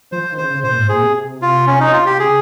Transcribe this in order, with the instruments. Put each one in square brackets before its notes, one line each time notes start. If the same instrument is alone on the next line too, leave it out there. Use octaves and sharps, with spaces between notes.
[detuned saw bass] F3 [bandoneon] C5
[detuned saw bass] D#3
[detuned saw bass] C#3 [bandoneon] C5
[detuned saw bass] C#3
[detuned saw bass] A#2 [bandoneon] C5
[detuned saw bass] G#2
[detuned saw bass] A#2 [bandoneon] G#4
[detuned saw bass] C3
[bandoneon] F4
C#4
D#4
F4
G4
[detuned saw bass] C#3 [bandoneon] G#4